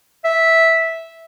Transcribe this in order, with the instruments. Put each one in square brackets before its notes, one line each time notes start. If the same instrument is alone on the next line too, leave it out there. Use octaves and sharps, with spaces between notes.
[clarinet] E5